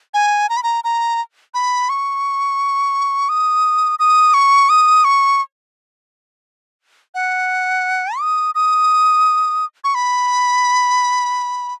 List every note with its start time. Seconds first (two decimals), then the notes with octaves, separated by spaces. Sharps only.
0.14 G#5
0.49 A#5
0.57 B5
0.63 A#5
0.84 A#5
1.54 B5
1.89 C#6
3.29 D#6
3.99 D#6
4.34 C#6
4.69 D#6
5.05 C#6
7.15 F#5
8.19 D#6
8.55 D#6
9.84 C#6
9.95 B5